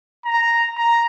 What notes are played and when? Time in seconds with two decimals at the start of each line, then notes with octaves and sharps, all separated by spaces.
0.25 A#5
0.77 A#5